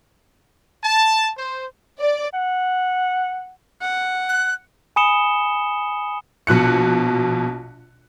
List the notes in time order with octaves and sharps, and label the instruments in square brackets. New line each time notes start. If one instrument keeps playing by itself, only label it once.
[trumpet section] A5
C5
[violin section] D5
[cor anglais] F#5
[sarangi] F#5
[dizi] F#6
[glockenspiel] G#5 B5 D#6 C#7 E7 G7
[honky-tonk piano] A#1 B2 F#6 C#7